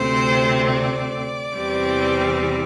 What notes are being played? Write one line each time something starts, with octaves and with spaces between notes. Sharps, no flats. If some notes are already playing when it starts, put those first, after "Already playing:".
Already playing: D2 C3 A3 C4 C5
D5
E2 C3 E3 G3 C4